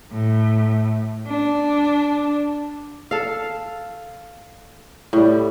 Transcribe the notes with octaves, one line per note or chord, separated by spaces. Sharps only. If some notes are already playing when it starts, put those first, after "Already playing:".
A2
D4
A4 F5
A2 G3